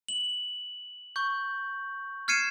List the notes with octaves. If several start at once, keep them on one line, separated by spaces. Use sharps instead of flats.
F#7
C#6 G6
F6 G#6 C7 C#7 D#7 E7